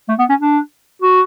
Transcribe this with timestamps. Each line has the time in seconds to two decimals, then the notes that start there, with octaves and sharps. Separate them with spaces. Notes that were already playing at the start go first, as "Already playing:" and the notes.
0.08 A3
0.19 B3
0.29 C#4
0.39 D4
1.02 F#4